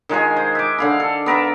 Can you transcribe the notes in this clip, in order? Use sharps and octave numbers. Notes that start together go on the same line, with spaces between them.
D#3 G#3 F4 G#4
C5
E5 D6
D3 F5 B5
A4
B3 A#4 E5 A5